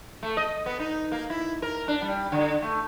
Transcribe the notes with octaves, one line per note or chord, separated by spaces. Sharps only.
A3
D#5
B3
D#4
A#3
E4
A#4
D4
G3
D3
A3